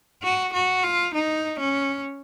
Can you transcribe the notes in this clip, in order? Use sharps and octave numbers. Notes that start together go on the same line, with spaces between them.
F#4
F#4
F4
D#4
C#4